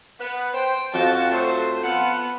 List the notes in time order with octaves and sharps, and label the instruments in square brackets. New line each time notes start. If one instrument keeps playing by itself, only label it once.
[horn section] B3
[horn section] C5 [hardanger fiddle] G5
[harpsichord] F2 G5 [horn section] F3 F#4 [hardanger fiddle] A5
[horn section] F#3 A3 [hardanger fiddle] C5
[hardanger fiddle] B3 [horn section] F4 A4 F#5